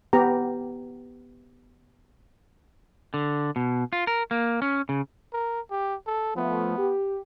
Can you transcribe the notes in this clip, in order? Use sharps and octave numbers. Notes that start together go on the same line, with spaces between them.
B3 G4 A#5
D3
B2
F4
A#4
A#3
C#4
C#3
A#4
G4
A4
F3 A3 B3
G4